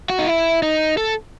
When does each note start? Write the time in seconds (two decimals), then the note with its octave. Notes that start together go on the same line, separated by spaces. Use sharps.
0.10 F#4
0.19 D#4
0.27 E4
0.63 D#4
0.97 A4